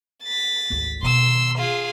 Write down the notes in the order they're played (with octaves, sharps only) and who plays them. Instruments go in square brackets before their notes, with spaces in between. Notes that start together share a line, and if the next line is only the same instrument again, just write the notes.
[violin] A6 B6
[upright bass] G#1 D2
[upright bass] B2 D#3 [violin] C6 E6
[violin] F4 G#4